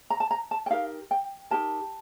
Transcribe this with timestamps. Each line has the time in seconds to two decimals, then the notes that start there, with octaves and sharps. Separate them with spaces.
0.10 A#5
0.20 A5
0.31 A#5
0.51 A5
0.66 G5
0.70 D#4 G4 A#4 F5
1.11 G5
1.51 D#4 G4 A#4 A5